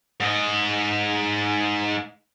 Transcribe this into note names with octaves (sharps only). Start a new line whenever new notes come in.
G#2 D#5